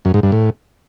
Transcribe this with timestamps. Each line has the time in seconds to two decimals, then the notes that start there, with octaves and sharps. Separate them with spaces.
0.05 F#2
0.14 G#2
0.23 G2
0.32 A2